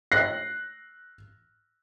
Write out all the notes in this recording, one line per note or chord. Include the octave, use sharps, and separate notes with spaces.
F#6 A#6 C7